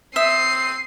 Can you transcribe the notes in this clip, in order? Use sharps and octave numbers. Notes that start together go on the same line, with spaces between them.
C4 E5 D#6 C7 D#7